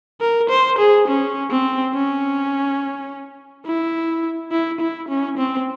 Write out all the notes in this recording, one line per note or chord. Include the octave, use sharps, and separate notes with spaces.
A#4
C5
G#4
C#4
C4
C#4
E4
E4
E4
C#4
C4